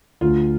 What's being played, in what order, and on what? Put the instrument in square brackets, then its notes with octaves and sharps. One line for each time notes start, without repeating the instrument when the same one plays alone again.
[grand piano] D2 F4